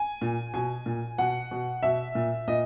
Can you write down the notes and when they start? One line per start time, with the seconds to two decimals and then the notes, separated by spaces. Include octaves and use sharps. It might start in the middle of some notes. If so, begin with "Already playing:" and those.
Already playing: G#5
0.21 A#2
0.54 B2 G#5
0.86 A#2
1.18 B2 F#5
1.51 B2
1.83 B2 E5
2.15 A#2
2.48 A#2 D#5